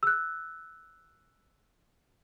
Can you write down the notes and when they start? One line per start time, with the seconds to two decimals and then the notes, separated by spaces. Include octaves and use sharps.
0.03 E6 F#6